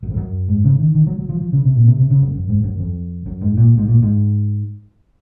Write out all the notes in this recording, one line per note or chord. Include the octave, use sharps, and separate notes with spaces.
F#2
F2
F#2
G#2
C#3
D#3
D#3
F#3
F#3
F3
F3
C#3
C3
A#2
C3
C3
C#3
F#2
F#2
G#2
F#2
F2
F#2
G#2
A#2
G#2
A#2
G#2